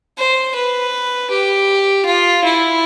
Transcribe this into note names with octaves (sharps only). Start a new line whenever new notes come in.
C5
B4
G4
F4
E4